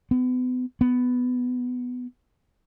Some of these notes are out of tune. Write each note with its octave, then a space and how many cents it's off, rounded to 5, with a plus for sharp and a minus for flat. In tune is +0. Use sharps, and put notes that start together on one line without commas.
B3 +35
B3 +10